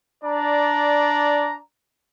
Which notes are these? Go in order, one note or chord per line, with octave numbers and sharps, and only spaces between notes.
D4 D5 A#5